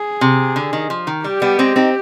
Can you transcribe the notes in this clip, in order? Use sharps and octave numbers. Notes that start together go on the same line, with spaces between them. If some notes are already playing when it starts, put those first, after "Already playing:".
Already playing: G#4
C3
D3
D#3
F3
D#3
G3 G4
G3 B3
G#3 C4
C4 D#4